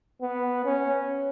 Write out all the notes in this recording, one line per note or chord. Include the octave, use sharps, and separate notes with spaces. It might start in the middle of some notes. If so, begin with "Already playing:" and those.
B3
C#4